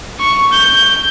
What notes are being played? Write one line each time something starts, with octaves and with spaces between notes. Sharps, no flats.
C#6
G6